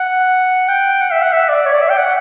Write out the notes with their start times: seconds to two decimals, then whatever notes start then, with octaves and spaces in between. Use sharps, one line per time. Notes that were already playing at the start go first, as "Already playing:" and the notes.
Already playing: F#5
0.68 G5
1.01 F#5
1.11 E5
1.23 F#5
1.33 E5
1.49 D5
1.66 C#5
1.74 D5
1.82 E5
1.90 G5
1.97 F#5